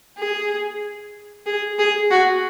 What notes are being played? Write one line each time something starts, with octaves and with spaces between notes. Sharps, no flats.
G#4
G#4
G#4
F#4